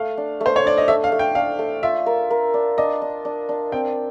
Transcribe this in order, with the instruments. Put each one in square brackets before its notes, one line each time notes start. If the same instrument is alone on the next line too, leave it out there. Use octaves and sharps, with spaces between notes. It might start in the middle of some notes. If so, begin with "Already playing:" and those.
Already playing: [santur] A3 [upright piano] F5
[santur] D4
A3
[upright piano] C5
C#5
[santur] D4 [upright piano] D5
[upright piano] D#5
[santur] A3 [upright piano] E5
[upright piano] F5
[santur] A3
[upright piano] G5
[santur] D4 [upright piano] F5
[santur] A3
[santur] F4 [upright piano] E5
[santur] A#4
A#4
D4
[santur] D4 [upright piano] D#5
[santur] D4
D4
D4
[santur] C4 [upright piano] G5